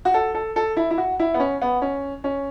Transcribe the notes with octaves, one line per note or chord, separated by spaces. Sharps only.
F#4
A4
A4
A4
E4
E4
F#4
E4
B3
C#4
B3
C#4
C#4